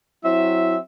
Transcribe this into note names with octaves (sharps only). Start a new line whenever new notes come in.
F#3 C4 E4 E5